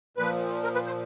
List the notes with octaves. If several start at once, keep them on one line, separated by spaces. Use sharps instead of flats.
A#2 F3 B4
A#4
B4
C5